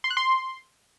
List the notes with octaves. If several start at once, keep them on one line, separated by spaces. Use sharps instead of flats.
C6
F#6
C6